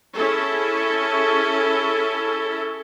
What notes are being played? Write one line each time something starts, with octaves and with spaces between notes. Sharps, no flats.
C#4 E4 G#4 A4